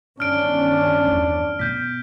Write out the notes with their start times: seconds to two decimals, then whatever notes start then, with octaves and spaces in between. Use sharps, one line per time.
0.20 G1 D#3 C#4 D4 F6 D7
1.07 E2
1.59 B2 G6 B6